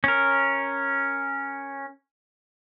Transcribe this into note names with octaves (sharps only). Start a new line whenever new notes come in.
C#4 A#4